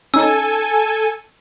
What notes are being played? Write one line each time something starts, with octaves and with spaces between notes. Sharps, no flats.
C#4 D#4 A4 G#5 E6